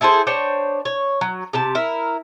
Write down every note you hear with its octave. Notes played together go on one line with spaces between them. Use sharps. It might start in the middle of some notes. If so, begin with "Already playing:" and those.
E4 G#4 A4 C5
D4 C5 C#5 G5
C#5
F#3
C3 G4 A5
E4 A#4